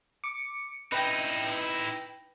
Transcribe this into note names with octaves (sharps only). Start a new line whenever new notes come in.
D6 C#7
D#4 E4 B4 G5 A#6